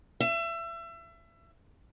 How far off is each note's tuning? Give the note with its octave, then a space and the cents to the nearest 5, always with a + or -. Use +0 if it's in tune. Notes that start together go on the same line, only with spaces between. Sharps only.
E5 +30